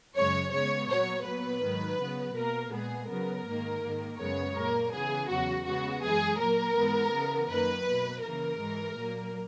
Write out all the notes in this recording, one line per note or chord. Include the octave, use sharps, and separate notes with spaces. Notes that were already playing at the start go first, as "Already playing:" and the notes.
F#2 C#3 G#3 C#5
C#3 G#3 B3 C#5
A#2 F#3 B3 C#5
A#2 F#3 B3 B4
G#2 D#3 F#3
C#3 F#3 B3
B2 A#3 A#4
A#2 G#3 B3 G#4
C#3 F#3 B3 A#4
G#2 D#3 A#3
G#2 D#3 A#3
F#2 C#3 G#3 B3 C#5
A#2 A#3 A#4
C#3 E3 B3 G#4
E2 C#3 F#3 F#4
C#3 G#3 B3 F#4
F#2 E3 G#3 G#4
A#2 F#3 A#3 A#4
G#2 E3 B3
C#3 E3 B3
F#2 D#3 A#3 B4
B2 A#3
C#3 E3 A#3 A#4
G#2 E3 G#3
A#2 F#3 A#3